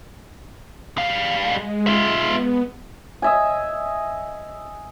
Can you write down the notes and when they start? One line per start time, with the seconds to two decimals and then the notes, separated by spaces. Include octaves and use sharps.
0.98 G3 F5
1.40 G#3
1.87 F4 E5
2.24 B3
3.22 D#5 E5 G#5